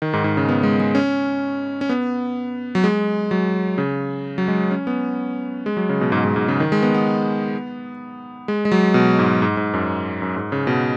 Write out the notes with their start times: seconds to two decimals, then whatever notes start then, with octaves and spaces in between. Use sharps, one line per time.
0.02 D#3
0.13 G#2
0.24 G#2
0.37 C#3
0.48 B3
0.63 G#3
0.80 G#3
0.95 C#4
1.81 C#4
1.89 B3
2.75 F#3
2.84 G#3
3.31 F#3
3.78 C#3
4.38 F#3
4.48 G#3
4.71 C#4
4.87 B3
5.66 G#3
5.77 F#3
5.89 C#3
6.01 B2
6.12 G#2
6.25 G#2
6.36 G#2
6.48 C#3
6.60 D#3
6.72 G#3
6.82 B3
6.94 B3
8.48 G#3
8.65 G#3
8.72 F#3
8.94 B2
9.19 G#2
9.42 G#2
9.57 G#2
9.74 F#2
10.22 F#2
10.36 G#2
10.52 C#3
10.67 B2